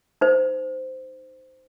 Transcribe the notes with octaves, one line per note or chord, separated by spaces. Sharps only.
D#4 C5